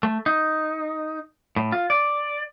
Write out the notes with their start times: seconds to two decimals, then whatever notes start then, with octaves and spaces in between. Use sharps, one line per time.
0.03 A3
0.26 D#4
1.56 A2
1.72 F4
1.90 D5